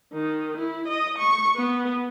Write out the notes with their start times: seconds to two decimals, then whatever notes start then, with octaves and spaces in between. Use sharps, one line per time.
0.13 D#3
0.58 E4
0.88 D#5
1.18 C#6
1.56 B3